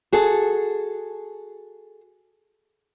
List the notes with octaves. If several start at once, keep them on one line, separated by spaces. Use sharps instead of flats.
F#4 G#4 A4